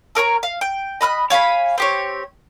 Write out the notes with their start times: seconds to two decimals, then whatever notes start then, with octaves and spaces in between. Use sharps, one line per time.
0.15 A4 A#4 C#5 A#5
0.43 F5
0.61 G5
1.01 D#5 B5 F6 F#6
1.30 C#5 F5 G#5 B5
1.78 C4 G4 C#5